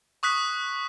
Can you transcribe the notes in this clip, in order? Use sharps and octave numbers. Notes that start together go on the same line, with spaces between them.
C#6 D#6 F#6 B6